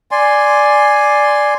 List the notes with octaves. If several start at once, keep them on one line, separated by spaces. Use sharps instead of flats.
D5 G#5 C6